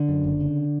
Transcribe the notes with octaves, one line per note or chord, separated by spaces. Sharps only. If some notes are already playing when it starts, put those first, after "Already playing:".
Already playing: D3
F#2
F#1
C#3